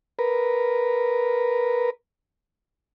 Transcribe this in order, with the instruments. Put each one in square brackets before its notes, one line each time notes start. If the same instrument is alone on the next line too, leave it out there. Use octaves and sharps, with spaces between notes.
[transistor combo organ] A#4 B4